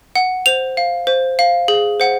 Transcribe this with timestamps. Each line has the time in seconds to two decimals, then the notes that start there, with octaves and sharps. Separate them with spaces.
0.16 F#5
0.46 C5 F7
0.77 F5
1.07 C5
1.39 F5
1.68 G#4
2.00 C5 F#5